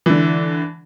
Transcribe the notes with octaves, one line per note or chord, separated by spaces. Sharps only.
D3 E3